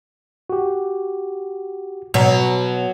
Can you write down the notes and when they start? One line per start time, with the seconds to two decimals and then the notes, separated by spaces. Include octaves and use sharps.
0.50 F#4 G4
2.14 B2 F#3